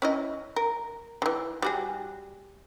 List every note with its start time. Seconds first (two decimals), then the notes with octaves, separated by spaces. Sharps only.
0.02 C#4 E4 D#5
0.56 A#4
1.22 D3 E3
1.62 G3 F#4 G#4